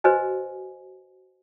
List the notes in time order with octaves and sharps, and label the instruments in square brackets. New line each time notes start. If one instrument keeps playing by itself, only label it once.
[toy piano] F#4 B4 C5 D#5 G#5